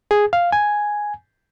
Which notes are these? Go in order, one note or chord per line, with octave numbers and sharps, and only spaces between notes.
G#4
F5
G#5